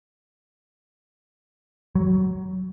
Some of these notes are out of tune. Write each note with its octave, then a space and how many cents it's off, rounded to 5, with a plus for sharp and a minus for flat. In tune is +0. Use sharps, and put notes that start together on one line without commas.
F#3 +20